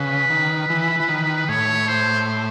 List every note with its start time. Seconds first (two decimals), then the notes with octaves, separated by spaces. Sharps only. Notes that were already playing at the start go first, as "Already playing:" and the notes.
Already playing: C#3 B4
0.30 D#3
0.70 E3
1.00 E3
1.09 D#3
1.49 A2 C#5
1.88 C5